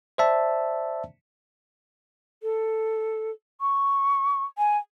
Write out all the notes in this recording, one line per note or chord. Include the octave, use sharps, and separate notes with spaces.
C5 D5 E5 A5
A4
C#6
G#5